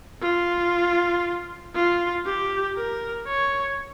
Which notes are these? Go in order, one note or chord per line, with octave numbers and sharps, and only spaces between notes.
F4
F4
G4
A#4
C#5